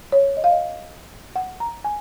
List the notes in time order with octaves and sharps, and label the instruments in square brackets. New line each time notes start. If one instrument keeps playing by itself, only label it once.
[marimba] C#5
D#5
F5
D#5
F#5
A#5
G#5